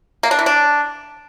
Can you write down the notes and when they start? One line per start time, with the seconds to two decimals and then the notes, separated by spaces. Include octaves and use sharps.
0.23 A#3
0.31 D4
0.39 E3
0.46 D4